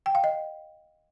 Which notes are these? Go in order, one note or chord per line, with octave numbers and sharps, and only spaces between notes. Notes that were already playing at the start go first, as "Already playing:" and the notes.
G5
F5
D#5